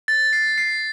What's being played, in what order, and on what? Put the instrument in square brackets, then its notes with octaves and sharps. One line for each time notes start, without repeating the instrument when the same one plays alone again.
[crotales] A6
C7
C7